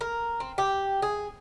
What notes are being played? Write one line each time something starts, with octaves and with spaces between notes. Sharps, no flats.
A#4
C4
G4
G#4